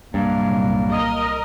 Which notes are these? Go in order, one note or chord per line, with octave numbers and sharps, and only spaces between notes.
C2 G2 A#2 F#3 A#3
A#4 D#5